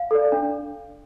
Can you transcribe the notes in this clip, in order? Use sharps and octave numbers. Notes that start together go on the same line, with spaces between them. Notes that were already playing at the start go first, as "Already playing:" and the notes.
Already playing: F5
A4 D5
D4